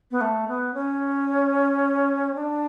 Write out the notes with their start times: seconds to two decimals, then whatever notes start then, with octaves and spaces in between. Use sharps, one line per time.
0.11 B3
0.21 A3
0.48 B3
0.74 C#4
2.35 D4